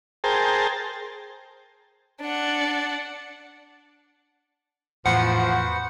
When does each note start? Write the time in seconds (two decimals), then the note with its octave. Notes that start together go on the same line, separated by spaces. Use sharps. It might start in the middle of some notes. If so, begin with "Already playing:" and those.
0.24 G#4 A#4 C5 G5 A5
2.21 D4 F#5
5.06 E2 A2 F3 F#4 B4 C5 F#5